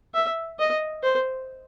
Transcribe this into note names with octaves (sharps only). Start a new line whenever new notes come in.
E5
D#5
C5